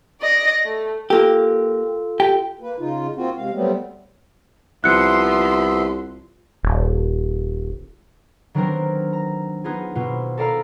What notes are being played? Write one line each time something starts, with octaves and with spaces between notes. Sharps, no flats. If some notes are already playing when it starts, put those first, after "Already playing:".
D5 D#5
A3
A#3 F4 G4 A4
G4 G5
A#3 B4
C#3 D#4 F4
A#3 C4 F4 F#4
C3 G#3 F5
F#3 G3 A3 B3 C4
C2 F3 B3 E5 C6 F#6 C#7
D#1
D#3 F#3 B3 C4 D4 A#4
A#5
B3 D#4 F4 G#4
B2 B3 C4 F4
A4 A#4 D5 F5 A#5 B5